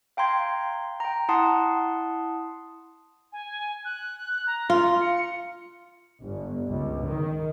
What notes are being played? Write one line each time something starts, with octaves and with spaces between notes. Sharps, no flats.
F5 G5 A#5 C6 G#6
G5 A#5
E4 F#5 A5 C6 D#6 C7
G#5
F#6
A#5
F4
C#7
G1
C#2
D#3